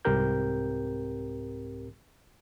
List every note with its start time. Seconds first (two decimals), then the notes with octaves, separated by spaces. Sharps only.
0.05 C2 G#2 C4 G4 A#4 G6